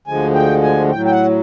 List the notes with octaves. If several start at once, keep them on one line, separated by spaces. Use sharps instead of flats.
D2 D3 F3 G#3 G#5
G5
G#5
A2 F#3 G5
G5
F#5